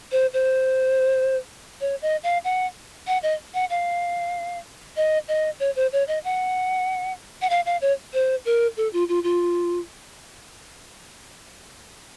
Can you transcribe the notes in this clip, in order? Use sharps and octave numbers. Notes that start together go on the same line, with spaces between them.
C5
C5
C#5
D#5
F5
F#5
F#5
D#5
F#5
F5
D#5
D#5
C#5
C5
C#5
D#5
F#5
F#5
F5
F5
C#5
C5
A#4
A4
F4
F4
F4